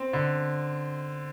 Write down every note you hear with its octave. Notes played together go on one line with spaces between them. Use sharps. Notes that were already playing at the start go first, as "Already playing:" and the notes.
Already playing: C4
D3